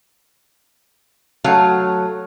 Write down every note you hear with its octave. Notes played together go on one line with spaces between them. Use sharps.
F#3 A3 F5